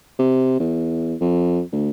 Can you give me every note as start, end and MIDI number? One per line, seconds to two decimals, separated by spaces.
0.19 0.59 48
0.60 1.15 40
1.21 1.62 41
1.73 1.91 38